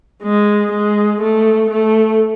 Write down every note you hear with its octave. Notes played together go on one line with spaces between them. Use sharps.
G#3
G#3
A3
A3